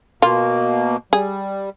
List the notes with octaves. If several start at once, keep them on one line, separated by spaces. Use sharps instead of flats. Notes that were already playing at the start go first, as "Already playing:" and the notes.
B2 A#3 F4
G3 G#4